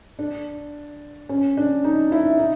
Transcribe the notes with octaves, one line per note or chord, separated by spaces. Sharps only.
D4
C#4
D4
D#4
E4
D#4